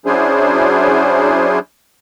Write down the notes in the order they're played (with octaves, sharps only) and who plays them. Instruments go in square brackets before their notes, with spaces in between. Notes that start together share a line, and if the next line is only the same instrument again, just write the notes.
[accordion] F#3 C#4 D4 E4 G#4 C5